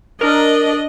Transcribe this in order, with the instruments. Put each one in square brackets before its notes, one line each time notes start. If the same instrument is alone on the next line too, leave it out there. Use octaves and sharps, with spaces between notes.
[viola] D4 D#5 [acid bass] A#4